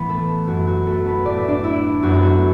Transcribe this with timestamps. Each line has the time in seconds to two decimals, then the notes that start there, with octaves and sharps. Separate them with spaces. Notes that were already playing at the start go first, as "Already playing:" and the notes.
Already playing: A2 E3 B3 B4
0.09 A3 A4
0.47 F#2 F#3 B3 F#4
0.67 F#4
0.86 A3 A4
1.06 B3 B4
1.25 A2 A3 D5
1.37 E5
1.48 D4 D5
1.64 E4 E5
2.03 F#2 F#3 B3 F#4
2.13 A4
2.23 F#4